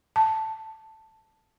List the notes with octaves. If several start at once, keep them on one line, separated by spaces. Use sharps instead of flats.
A5